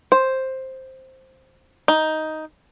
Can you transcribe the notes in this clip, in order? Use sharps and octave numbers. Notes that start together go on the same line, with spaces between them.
C5
D#4